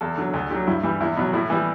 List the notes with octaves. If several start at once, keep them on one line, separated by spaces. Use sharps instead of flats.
E2 A4
D3 F#3
D2 A4
D3 F#3 G4
G2 E4
E3 G3
E2 E4
B2 F#3
A2 E4
E3 G3